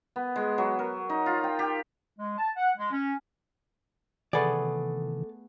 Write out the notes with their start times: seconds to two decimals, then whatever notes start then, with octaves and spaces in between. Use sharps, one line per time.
0.16 B3
0.36 G#3
0.58 F#3
0.79 A#4
1.10 D#4
1.26 F4
1.44 G5
1.59 G4
2.18 G#3
2.38 A5
2.56 F#5
2.77 G#3
2.92 C#4
4.33 C3 D#3 E3 A3 B3 G#4 A4 D5